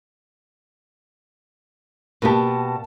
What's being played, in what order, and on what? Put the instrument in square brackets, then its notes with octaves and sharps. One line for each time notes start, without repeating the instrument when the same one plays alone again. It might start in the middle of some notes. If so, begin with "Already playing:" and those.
[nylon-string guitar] B2 B3 G4 [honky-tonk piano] A#3 A5